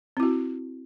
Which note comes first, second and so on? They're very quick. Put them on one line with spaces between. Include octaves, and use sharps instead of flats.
C4 E4 F#4